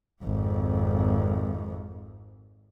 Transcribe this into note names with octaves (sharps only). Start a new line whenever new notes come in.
G#1 F2